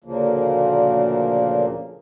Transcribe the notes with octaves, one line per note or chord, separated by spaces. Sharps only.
D2 A#2 C#3 F3 A#3